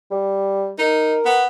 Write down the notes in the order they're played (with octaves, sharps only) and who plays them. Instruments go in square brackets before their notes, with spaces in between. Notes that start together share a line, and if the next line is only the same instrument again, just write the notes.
[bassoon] G3
[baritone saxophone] D#4 [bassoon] A#4
[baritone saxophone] B3